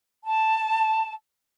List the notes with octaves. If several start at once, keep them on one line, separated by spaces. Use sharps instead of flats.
A5